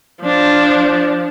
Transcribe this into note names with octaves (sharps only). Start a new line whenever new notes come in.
F3 D4